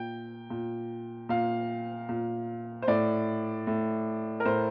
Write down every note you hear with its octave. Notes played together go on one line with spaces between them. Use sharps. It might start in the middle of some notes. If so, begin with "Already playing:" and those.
Already playing: A#2 G5
A#2
A#2 F5
A#2
C5
A2 D5
A2
A#4
A2 C5